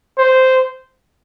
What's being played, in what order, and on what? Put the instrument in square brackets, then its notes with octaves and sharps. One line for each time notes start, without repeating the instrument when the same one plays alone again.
[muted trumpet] C5